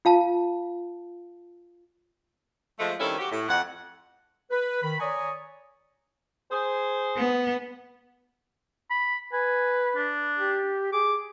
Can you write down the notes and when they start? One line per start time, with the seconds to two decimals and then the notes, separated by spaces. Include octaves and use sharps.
0.05 F4 F5 A5
2.79 F3 G#3 A3
3.00 D#3 G3 C4 C#4 E4 A4
3.19 F#4 G4
3.32 A2
3.49 F2 F#5
4.50 B4
4.83 D#3 B5
5.00 C#5 D5 G#5 A#5 C#6 D#6
6.50 G#4 C5
7.17 B3
8.91 B5
9.33 B4 G#5
9.96 D4
10.37 G4
10.93 G#4 D6